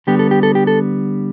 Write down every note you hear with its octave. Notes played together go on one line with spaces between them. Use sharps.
D3 G3 B3 G4
A4
G4
A4
G4
A4